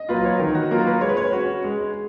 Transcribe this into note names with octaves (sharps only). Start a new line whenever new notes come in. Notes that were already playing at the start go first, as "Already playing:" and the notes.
Already playing: D#5
F#3 A#3 F4 B4
C#5
D#3 A#4
F#4
F#3 A#3 F4 A#4
B4
G#3 C#5
B4
C#5
C#4 F#4
G#3